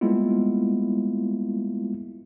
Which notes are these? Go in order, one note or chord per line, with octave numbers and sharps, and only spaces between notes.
G3 G#3 A#3 B3 E4 F4